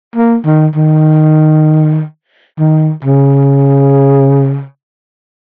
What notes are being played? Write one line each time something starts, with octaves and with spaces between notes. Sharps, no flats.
A#3
D#3
D#3
D#3
C#3